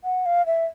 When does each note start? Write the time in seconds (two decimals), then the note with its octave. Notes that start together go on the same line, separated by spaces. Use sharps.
0.04 F#5
0.26 F5
0.46 E5